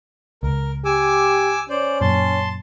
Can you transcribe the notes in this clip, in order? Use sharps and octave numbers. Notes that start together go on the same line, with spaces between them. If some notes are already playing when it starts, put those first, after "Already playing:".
C#2 A#4
G4 G#5 D6 E6
C#4 C5 D5
F#2 A#2 A5 C6